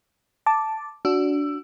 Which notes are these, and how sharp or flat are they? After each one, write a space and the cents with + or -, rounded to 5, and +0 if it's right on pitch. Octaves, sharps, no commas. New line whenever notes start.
A5 +0 D6 +0
D4 -20 F#4 -5 E6 +15